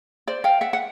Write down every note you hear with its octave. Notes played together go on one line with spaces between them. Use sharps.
C5 D5
F5 G5
E5 F#5
F#5